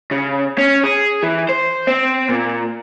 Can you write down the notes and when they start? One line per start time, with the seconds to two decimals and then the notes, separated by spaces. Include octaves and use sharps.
0.11 C#3
0.58 C#4
0.83 G#4
1.23 E3
1.49 C5
1.87 C4
2.29 A#2